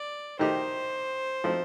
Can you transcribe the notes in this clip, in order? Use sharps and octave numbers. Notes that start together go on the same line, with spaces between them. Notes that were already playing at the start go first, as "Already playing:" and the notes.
Already playing: D5
D#3 A3 D#4 G4 C5
F3 A3 C4 D#4